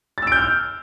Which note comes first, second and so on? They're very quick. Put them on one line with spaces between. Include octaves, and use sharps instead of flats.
A6 E6 D7 G6 F6